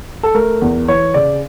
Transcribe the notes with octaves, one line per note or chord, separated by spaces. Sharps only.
A4
A3 A#4
E2
E3 C#5
C#3 D5